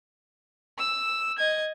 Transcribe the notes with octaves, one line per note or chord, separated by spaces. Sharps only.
E6
D#5 G#6